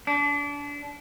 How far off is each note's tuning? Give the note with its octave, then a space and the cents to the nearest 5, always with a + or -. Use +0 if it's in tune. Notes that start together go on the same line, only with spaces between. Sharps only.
D4 -30